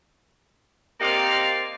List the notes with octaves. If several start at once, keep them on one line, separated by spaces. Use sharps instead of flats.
A#3 C4 D#4 G4 D5 F5